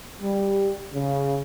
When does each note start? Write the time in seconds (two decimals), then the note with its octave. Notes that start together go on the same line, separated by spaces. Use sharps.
0.22 G3
0.94 C#3